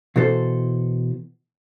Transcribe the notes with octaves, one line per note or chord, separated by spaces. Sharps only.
B2 E3 A4 C5